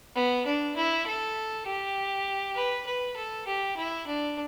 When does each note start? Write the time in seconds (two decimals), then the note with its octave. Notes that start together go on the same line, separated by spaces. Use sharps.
0.15 B3
0.46 D4
0.76 E4
1.06 A4
1.66 G4
2.56 B4
2.86 B4
3.16 A4
3.46 G4
3.76 E4
4.07 D4